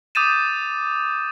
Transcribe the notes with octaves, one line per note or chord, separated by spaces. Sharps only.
D6 D#6 G6 A6 D#7 E7